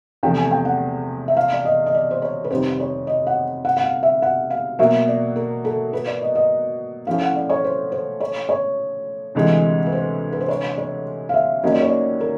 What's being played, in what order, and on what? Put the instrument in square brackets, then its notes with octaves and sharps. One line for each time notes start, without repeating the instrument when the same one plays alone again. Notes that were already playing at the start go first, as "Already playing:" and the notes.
[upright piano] E2 C3 F3 A3 [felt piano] G5
[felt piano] G#5
G5
F#5
E5
F5
D5
D#5
D#5
D5
C5
C#5
B4
[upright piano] F2 C3 D#3 G3 [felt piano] C5
[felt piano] C#5
D#5
F#5
F#5
F#5
F5
E5
F#5
F5
[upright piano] B2 F#3 A#3 [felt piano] E5
[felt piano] D5
A#4
A4
B4
D5
D#5
D#5
[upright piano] A2 F3 A3 C#4 E4 [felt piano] F5
[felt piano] F#5
D5
C#5
C5
C5
C#5
C#5
[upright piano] D2 C3 E3 G#3
[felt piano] B4
C5
B4
C5
C#5
C#5
F5
E5
[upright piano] D#2 D#3 F#3 A#3 C#4 [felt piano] D#5
[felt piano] D5
C#5
D5
A#4